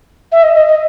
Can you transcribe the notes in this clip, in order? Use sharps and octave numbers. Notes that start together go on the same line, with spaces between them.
E5
D#5
D#5
D#5